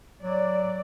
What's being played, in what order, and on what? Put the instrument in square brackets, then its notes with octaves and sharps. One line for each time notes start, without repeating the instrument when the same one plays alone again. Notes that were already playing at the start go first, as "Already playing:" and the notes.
[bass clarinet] F#3 [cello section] D5